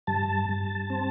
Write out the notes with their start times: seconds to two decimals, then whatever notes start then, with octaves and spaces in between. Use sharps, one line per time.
0.07 G2 A5
0.49 G2
0.90 C4